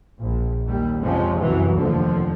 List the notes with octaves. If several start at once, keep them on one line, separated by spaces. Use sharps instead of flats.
A#1
D#2 G3
F2 C3 F3 G#3 C#4
C2 F#2 B2 E3 F#3
F1 D#2 D3 F3